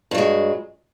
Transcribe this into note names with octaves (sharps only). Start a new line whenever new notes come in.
G2 F#3 G#3